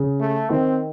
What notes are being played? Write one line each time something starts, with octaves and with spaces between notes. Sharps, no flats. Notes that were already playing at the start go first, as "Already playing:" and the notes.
Already playing: C#3
A3
D#3 C4